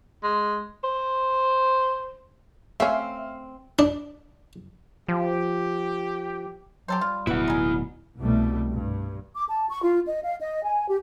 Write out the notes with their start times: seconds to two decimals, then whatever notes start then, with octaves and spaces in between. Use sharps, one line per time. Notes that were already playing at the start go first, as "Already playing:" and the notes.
0.23 G#3
0.84 C5
2.80 A3 C4 C#4 E5 F5
3.79 D4
5.08 F3 G4
6.88 F#3 G4 A4 C5
7.01 G3 F4
7.27 D1 B2 E4 B4 F#5
7.48 D#4 G#4
8.19 C2 B2 G3 A3
8.74 G2
9.35 D6
9.49 A5
9.70 C#6
9.84 F4
10.06 D#5
10.23 F5
10.40 D#5
10.64 G#5
10.88 G4